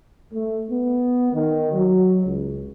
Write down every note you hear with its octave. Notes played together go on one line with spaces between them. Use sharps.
A3
B3
D#3
F#3
C#2